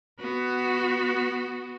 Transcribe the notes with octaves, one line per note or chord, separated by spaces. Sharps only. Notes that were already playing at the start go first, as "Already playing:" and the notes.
B3 F#4